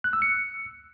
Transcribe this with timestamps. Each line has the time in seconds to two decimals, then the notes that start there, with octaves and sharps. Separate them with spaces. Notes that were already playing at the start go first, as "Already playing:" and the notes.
0.04 F#6
0.13 E6
0.22 C#7